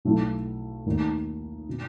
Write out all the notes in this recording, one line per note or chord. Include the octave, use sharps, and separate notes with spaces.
B1 B2 A3 E4
D#2 D#3 A3 D#4
B2